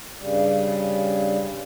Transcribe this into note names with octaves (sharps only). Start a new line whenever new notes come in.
G2 C#3 G3